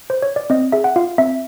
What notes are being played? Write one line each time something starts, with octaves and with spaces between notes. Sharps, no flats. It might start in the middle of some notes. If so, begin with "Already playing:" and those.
C5
C#5
D5
C4 D#5
G#4 E5
F#5
F4 F5
C4 E5